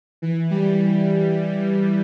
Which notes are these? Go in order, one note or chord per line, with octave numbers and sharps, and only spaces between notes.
E3
G3